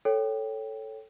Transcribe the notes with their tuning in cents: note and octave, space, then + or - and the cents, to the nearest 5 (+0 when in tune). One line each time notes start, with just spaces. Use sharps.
A4 +0 C#5 -5 G5 +0